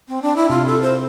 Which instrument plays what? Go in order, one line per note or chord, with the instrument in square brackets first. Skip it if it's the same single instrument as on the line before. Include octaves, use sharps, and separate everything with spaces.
[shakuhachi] C4
D4
E4
[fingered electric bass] C3 [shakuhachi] F4
[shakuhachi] A4
C5